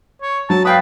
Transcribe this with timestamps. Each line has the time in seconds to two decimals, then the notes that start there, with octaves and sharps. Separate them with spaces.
0.22 C#5
0.50 F#3 A5
0.65 B4 F5 G5 D#6